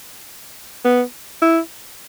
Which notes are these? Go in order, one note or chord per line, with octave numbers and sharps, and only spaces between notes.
B3
E4